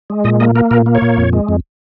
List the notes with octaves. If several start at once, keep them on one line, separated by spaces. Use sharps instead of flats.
G#3
A#2 D#5
A#3 D#5
A#3 A#4
A#2 A#4
A#3
C#5
A#2
F2
G#3
F2